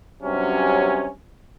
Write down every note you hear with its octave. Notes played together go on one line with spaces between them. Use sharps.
G2 C3 F#3 C#4